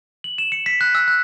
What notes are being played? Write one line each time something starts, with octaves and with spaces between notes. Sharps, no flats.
F#7
E7
C#7
B6
F#6
E6
F#6